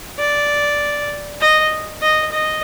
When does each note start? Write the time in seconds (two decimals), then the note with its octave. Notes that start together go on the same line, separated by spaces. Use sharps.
0.19 D5
1.41 D#5
2.02 D#5
2.32 D#5